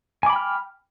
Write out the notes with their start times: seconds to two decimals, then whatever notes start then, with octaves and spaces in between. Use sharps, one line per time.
0.23 G#5
0.26 D6
0.30 B5
0.33 G5
0.36 F6